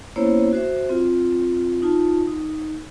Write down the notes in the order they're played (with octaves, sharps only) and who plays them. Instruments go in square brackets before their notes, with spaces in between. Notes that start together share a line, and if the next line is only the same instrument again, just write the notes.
[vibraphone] A#3 B3 C#4 E4 C5 C#5
F#4 C5 E5
C4 F4
D#4 F4 A5
D#4